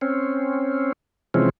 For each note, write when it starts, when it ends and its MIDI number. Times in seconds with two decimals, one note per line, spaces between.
0.01 0.92 60
0.01 0.92 61
1.34 1.49 48
1.34 1.49 52
1.34 1.49 53
1.34 1.49 56
1.34 1.49 60
1.34 1.49 61